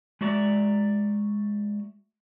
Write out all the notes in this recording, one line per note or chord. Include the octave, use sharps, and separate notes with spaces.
G#3 D4 F#4 D5 E5 A#5